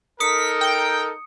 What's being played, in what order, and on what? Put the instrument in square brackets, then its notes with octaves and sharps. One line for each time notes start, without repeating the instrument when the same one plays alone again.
[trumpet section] D#4 A4 A#4 [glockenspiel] D#6 C#7 [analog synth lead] B6
[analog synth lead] G5